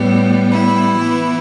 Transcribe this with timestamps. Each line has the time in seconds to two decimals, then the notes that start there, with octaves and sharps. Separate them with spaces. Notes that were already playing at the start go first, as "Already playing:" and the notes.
Already playing: A2 G3 B3
0.50 E4
0.98 E3 B3